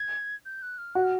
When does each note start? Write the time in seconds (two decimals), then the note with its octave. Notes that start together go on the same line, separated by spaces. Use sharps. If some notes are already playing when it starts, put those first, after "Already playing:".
Already playing: G#6
0.45 G6
0.62 F#6
0.78 F6
0.95 F#4 F#6
1.04 F6